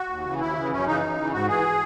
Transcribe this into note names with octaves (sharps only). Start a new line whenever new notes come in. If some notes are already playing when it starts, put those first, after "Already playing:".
Already playing: F#4
D#2
C#3 E3
D#2 E4
C#3 E3
F#2 C#4
C#3 E3 D#4
F#2
C#3 E3
G#2 F#4
E3 G#4